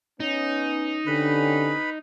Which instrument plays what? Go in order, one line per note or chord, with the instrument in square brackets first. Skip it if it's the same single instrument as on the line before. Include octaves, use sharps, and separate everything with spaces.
[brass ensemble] B3 C#4 [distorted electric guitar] D#4
[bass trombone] D3 [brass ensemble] C4 C#4 G4 [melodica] B4 B5